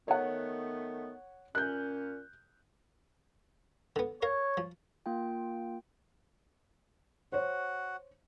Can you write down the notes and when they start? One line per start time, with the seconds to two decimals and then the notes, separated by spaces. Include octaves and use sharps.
0.08 D#3 A3 B3 C#5 F#5
1.55 A#2 C#4 F#6 G6
3.96 D3 B3
4.22 A#4 C#5 F5
4.57 F3
5.06 A#3 F4 G5
7.32 F#4 C5 C#5 F#5